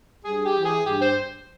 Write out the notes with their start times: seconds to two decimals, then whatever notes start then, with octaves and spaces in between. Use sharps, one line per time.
0.24 G2 G#4
0.45 G4
0.55 E3
0.65 G#4
0.85 G2 G4
1.01 C5